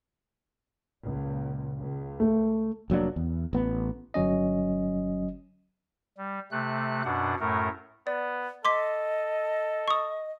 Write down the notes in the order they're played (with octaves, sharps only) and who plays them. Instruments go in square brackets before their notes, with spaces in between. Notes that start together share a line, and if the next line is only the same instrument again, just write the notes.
[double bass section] C#2 A#2
C#2
[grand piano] A3
[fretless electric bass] F1 F#3 A#3 D4
E2
A1 B3
[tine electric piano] G1 F#3 C#4 D#5
[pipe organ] G3
C3 A3 F#6
F#2 B2 D4 F#5
F#2 A2 A3 A#4
[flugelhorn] B3 [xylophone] D5
[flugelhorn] A4 [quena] D#5 [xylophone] C6 D6 B6
[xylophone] C#6 D#6